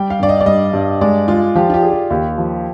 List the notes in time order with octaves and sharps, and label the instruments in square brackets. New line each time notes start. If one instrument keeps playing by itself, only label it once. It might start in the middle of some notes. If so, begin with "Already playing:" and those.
Already playing: [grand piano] G3 [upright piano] G5
[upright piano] F5
[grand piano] G2 [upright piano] D5
[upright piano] D#5
D5
[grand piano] G3 [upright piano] D#5
[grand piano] G2
[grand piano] G#3 [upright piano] D5
[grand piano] G#3 [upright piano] F4
[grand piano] F3 [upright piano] G4
[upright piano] F4
G4
[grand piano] G#4
[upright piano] G4
[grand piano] D#2 [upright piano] G4
[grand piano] F3